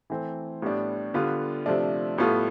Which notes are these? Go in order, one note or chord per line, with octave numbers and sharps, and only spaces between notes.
E3 A3 C4
A2 G3 B3 D4
D3 G3 B3 F4
C3 F3 A3 D4
A2 G3 B3 F4 A4